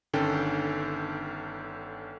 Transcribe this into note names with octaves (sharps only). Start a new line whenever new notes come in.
G1 D3 D#3 C#4 A4 G5